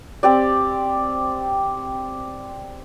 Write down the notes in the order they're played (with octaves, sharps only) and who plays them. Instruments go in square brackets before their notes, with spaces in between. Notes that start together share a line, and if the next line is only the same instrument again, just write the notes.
[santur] C4 G4 D5